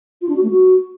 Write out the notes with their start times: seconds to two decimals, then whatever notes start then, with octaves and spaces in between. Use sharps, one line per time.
0.22 F4
0.29 D4
0.36 F#4
0.43 A3
0.50 F#4